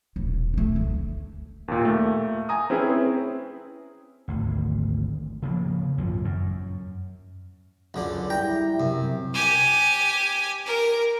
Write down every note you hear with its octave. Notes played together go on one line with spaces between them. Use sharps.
D#1
E3 A3
D2
D#2 A#2
A3 A#3
G#5 A#5 D#6
C4 C#4 E4 G#4 B4
G#1 D2
C#3 F3 A#3
G#1 F#2 A#2 F3
F#2
C#2 F#2 D3 D4
G3 E4 G5 A#5
F#2 C3
G4 G#5
A#4